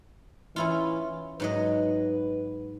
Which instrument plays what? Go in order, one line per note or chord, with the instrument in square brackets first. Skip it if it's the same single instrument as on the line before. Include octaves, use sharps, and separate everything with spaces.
[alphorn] E3 [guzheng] C#4 E4 F4
[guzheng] G#2 F#3 D#5 [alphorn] B4